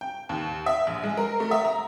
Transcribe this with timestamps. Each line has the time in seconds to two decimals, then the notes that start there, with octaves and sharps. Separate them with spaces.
0.01 G5
0.29 D#2
0.66 E5
0.87 A#1
1.04 G#3
1.17 A#4
1.40 A3
1.51 E5
1.65 A#5